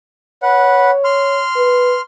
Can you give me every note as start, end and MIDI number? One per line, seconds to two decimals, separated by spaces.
0.43 0.91 71
0.43 1.41 73
0.43 0.91 78
1.04 2.01 84
1.04 2.01 89
1.56 1.96 71